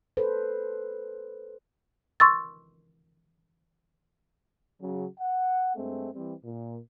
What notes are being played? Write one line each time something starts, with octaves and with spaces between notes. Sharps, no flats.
A4 B4 C5
C6 C#6 E6 A6
C#3 F#3
F#5
G2 G#3 A3 C4
E3 G3 C4
A#2